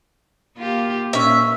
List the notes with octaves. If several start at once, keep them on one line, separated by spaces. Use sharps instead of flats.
A#3 F4 G4
A#2 C#4 E5